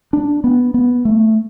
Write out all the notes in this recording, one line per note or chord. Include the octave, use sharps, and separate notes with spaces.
D4
B3
B3
A3